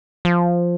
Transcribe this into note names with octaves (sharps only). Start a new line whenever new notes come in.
F3